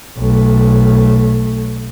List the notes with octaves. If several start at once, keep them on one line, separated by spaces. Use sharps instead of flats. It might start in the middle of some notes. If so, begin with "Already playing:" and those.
B1 A3